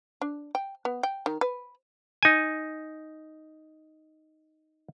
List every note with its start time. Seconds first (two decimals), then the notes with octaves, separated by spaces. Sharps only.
0.21 D4
0.55 G5
0.85 B3
1.03 G5
1.26 D#3
1.41 B4
2.23 D#4 G#5